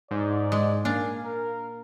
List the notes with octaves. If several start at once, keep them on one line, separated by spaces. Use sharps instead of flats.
G#2 D5
G#3
A#3 D4 F5 G#5
A#4